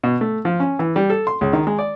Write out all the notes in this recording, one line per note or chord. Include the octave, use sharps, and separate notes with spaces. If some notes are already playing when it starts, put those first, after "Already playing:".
B2
A3
F3
C#4
E3
G3
A4
C6
C#2
D#3
G#3
D5